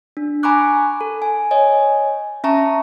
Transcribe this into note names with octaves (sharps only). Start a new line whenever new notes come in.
D4
G#5 A#5 B5 C#6 D6 F#6
A4
G#5
C#5 D#5 G#5
C#4 E5 A5 A#5 C#6